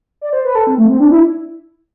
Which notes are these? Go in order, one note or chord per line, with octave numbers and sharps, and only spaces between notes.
D5
C5
B4
A4
C4
A3
C4
D4
E4